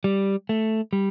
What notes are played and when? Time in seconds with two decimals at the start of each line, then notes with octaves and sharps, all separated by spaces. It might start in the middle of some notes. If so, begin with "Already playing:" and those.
0.04 G3
0.49 A3
0.93 G3